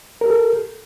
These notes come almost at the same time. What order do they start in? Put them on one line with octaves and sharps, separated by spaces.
A#4 G4 A4